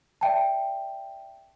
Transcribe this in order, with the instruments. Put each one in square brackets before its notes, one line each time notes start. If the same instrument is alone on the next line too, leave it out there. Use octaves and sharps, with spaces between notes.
[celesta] D5 E5 G5 A5